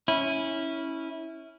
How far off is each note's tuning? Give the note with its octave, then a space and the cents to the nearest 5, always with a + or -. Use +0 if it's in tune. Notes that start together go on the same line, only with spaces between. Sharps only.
C#4 +0 E4 -15